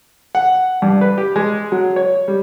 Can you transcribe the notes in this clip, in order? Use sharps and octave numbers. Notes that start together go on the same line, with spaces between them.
F#5
G2
B4
G4
G#3
F#3
C#5
G3